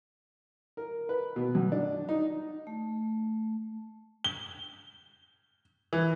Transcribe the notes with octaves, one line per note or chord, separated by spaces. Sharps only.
A#4
B4
B2
F#2
D4
D#4
A3
G7
E3